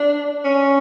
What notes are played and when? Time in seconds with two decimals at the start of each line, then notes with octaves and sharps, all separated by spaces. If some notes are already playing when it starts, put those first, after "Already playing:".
Already playing: D4
0.44 C#4